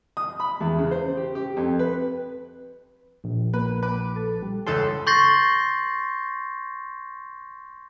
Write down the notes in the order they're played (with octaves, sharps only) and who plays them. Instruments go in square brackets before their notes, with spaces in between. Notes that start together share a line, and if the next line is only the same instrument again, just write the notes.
[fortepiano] D#6
B5
E2
C#3
C5
G4
G4
F2
B4
[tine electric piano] A#1
[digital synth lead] A#3 [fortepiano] B4
[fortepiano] B4 [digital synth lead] D6
[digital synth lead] A4
G3
[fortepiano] C#2 A4 A5 [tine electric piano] C6 [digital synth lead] G6
[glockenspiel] C6 C#6 G6 A6 A#6 C7